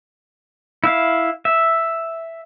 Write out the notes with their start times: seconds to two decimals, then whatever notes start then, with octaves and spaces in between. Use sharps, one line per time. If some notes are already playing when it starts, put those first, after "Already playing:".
0.84 E4 E5 F5
1.45 E5